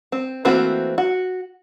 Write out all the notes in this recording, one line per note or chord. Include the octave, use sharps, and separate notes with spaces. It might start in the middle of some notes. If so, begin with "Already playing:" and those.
C4
E3 A3 A#3 C4 F#4
F#4